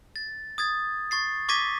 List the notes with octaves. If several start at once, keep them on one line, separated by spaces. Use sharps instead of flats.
A6
D#6 G#6 A6
C#6 A6 C7
C#6 D6 G#6 A#6 B6 D#7